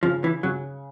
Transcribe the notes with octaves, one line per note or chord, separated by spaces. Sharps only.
C#3 F3
E3
C#3 F#3